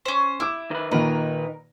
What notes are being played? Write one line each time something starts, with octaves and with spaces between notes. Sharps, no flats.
C#4 C5
E4 D6 E6
D#3 B4
A#2 D#3 D#4 A#4 B4